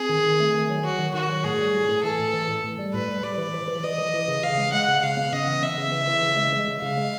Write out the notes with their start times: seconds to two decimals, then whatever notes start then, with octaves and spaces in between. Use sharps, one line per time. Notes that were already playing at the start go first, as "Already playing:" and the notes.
Already playing: C4 G#4
0.09 D#3
0.24 D#3
0.40 A3
0.54 D#3
0.69 F#3
0.84 F#3 F#4
0.99 D#3
1.14 D#3 F#4
1.29 F#3
1.44 A2 G#4
1.59 G3
1.74 A2
1.89 A2
2.03 E3 A4
2.19 A2
2.33 E3
2.48 A2
2.64 A2
2.78 G3
2.93 A2 B4
3.08 G3
3.23 G3 D5
3.38 E3
3.54 E3
3.68 E3
3.83 E3 D#5
3.98 E3
4.14 E3
4.28 C#3
4.43 C#3 F5
4.58 G#3
4.73 G#3 F#5
4.88 C#3
5.03 C#3 F5
5.17 B3
5.32 C#3 D#5
5.47 E3
5.62 B3 E5
5.78 C#3
5.92 E3
6.07 E3
6.22 C#3
6.37 G#3
6.53 G#3
6.67 C#3
6.82 C#3 F5
6.97 G#3